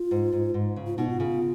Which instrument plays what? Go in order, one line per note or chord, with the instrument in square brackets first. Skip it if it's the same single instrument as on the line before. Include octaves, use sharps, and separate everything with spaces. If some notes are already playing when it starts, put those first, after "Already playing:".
Already playing: [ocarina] F4
[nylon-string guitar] G#2
G#2
G#2
C#3
[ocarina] F4
[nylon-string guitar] B2 [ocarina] D#4
[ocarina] F4
[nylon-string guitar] C#3